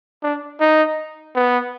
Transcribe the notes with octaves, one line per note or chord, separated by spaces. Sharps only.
D4
D#4
B3